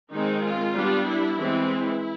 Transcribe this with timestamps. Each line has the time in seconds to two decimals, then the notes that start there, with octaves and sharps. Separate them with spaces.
0.12 D#3 G#3 C4 D#4
0.43 F4
0.75 G3 B3 D4
1.06 E4
1.37 E3 G#3 C4
1.68 E4